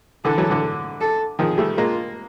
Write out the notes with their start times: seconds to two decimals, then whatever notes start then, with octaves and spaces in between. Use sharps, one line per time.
0.25 D3 E3 A4
0.38 E3 F#3
0.50 D3 E3
1.01 A4
1.39 D#3 F3 G#4
1.58 G3 A3
1.77 G#3 A#3 F4